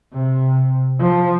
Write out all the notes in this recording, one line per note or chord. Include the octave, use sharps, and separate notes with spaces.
C3
F3